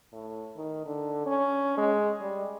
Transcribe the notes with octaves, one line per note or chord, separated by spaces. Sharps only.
A2
D#3
D3
C#4
G#3
G3